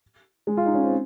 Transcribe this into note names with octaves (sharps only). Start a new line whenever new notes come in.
G#3
F4
D#4
C#4
C4